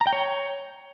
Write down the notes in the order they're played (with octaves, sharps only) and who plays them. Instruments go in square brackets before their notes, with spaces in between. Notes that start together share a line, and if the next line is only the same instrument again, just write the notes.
[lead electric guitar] A#5
G5
C#5